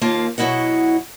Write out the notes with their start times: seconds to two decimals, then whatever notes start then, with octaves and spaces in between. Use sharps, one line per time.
0.01 D#2 A#3 F4 F5 A5
0.38 B2 F#3 C4 E4 D#5 F#5